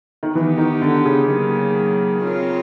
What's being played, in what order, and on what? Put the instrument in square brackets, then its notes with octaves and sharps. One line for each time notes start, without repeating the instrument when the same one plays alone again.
[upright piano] D#3
[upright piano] E3 [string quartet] B3 D#4 G4
[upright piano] D#3
D3
C#3
[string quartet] D#3 F#3 A#3
C4 F4 A#4 C#5